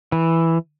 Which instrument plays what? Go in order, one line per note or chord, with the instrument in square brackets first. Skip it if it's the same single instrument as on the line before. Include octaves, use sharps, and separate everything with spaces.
[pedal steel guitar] E3